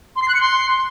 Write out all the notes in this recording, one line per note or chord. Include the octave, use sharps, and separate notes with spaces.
C6
C7
F#6
C#7
C6